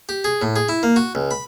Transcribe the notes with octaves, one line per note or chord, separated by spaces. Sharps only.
G4
G#4
A2
G#4
E4
A#3
F#4
C#2
B5